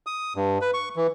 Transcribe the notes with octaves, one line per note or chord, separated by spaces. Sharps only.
D#6
G2
B4
C#6
E3